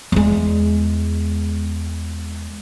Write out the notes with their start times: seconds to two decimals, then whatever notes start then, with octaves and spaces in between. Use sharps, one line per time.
0.12 E2 G#3